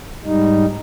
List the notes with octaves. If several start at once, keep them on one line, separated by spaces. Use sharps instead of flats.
G#2 G3 D#4